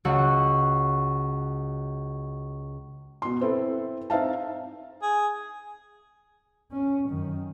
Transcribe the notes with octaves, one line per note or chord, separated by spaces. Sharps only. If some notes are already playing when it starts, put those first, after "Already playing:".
C#2 F#4 F#5 E6
B2 C6
C4 E4 A4 B4
C4 D#4 E5 F5 A5
G#4
C#4
F#2 D#3